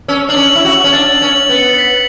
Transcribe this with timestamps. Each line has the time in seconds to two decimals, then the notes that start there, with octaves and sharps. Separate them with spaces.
0.08 C#4 E6
0.29 D4 F#7
0.36 C#4
0.52 E4 F#7
0.65 F#4
0.72 F#7
0.84 C#4
0.93 D4 A6
1.15 F#7
1.21 C#4
1.35 F#7
1.49 B3
1.56 C#7
1.78 B6